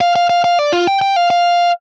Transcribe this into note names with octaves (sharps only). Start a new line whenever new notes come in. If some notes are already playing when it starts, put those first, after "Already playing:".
F5
F5
F5
F5
D5
F4
G5
G5
F5
F5